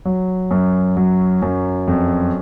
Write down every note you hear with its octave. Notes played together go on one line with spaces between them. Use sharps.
F#3
F#2
F#3
F#2
F2